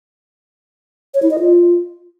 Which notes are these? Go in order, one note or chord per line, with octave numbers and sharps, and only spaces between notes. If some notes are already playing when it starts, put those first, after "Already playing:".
C#5
E4
D#5
F4